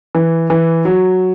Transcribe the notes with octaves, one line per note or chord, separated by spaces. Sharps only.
E3
E3
F#3